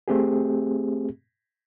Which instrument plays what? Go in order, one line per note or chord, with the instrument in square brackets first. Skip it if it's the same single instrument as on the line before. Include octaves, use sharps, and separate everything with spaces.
[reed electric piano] A3 C4 G4 G#4